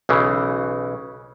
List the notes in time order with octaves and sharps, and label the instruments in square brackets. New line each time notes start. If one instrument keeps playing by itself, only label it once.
[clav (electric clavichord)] B1 C#3 E3